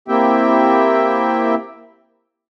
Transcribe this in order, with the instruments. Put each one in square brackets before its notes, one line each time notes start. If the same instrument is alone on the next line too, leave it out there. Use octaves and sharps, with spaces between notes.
[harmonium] A#3 C4 E4 G4 E5 G5